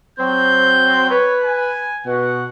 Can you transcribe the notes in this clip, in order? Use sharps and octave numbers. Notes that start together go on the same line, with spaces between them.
F#3 C4 G6
B4 C#5
G#5
B2 F#5